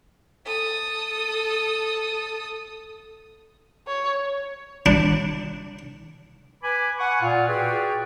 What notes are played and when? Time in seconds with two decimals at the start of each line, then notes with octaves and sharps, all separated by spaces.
0.46 A4 D#6
3.87 C#5
4.86 D4
6.63 B4 G#5 B5 D6
6.98 F#5 G#5 C#6
7.21 A#2 F4
7.48 F#4 G#4 B4 C#5 D5 G5